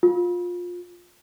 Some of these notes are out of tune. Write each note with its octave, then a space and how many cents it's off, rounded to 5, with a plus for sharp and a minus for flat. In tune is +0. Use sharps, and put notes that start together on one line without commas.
F4 +20